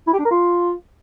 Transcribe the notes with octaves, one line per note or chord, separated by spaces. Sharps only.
E4
G4
D4
A#4
F4